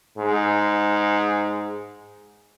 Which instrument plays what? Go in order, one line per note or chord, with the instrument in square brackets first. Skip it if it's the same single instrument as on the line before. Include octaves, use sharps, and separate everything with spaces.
[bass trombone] G#2